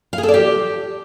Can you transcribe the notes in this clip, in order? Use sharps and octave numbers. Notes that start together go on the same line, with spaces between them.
F5
G#4
A4
D5
G4